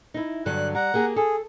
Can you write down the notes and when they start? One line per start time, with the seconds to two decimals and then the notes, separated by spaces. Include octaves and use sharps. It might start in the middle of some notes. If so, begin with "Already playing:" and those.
0.14 D#4 E4
0.46 G2 D3 F#3 F#6
0.75 G3 F#5 A#5
0.94 A#3 G4 G#4
1.16 G#4 A4